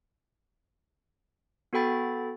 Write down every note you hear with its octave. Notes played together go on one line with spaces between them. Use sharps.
B3 F#4 A4 G5 B5 A6